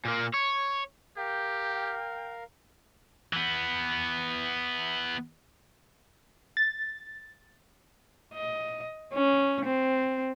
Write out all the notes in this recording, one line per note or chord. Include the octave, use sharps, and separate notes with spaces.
A#2 A#3
C#5
G4 A#4 F5 G5
E3 B3
A6
D#5
C#4
C4